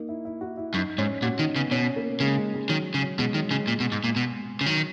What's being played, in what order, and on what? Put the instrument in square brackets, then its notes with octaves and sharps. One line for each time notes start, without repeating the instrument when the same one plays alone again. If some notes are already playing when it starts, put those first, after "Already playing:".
Already playing: [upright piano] A#3 D#4
E4
E4
F#4
E4
[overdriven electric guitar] F#2 [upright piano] D#4
[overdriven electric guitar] G#2 [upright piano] C#4
[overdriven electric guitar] A#2 [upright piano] F#4
[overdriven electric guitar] D#3 [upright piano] D#4
[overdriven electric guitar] C#3 [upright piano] B3
[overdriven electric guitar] B2 [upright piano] C#4
[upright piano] A#3
[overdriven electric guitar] C#3 [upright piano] G#3
[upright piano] G#3
G#3
[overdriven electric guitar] D#3 [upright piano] F#3
[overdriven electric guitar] C#3
[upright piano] F#3
[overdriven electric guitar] B2 [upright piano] G#3
[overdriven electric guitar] D#3 [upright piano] F#3
[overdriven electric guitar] C#3 [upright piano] G#3
[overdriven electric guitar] A#2
B2
G#2
A#2
B2
C#3
[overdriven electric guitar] D#3 [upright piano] F#3